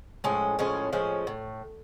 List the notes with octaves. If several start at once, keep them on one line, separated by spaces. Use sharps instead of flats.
A2 F3 G#3 C#4
A2 F3 G#3 C#4
A2 F3 G#3 C#4
A2